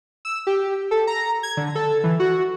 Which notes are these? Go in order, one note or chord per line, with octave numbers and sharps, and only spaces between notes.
E6
G4
A4
A#5
G#6
D3
A4
E3
F#4